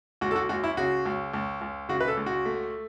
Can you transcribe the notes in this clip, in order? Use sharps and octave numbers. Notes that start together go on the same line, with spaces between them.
C#2 F#4
A4
F#4
C#2 F#4
E4
C#3 F#4
C#2
C#2
C#2
C#3 F#4
B4
A4
C#2
F#4
A3